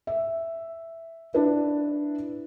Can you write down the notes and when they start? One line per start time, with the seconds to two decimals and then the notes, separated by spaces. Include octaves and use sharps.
0.07 E5
1.34 D4 E4 B4 E5